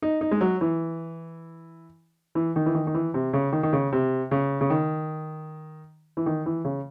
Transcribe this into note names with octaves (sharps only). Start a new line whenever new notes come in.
D#4
D#4
G#3
F#3
E3
E3
D#3
E3
D#3
D#3
E3
C3
C#3
D#3
D#3
C#3
C3
C#3
C#3
D#3
E3
D#3
E3
C#3